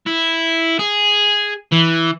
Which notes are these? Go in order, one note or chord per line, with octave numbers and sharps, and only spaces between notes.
E4
G#4
E3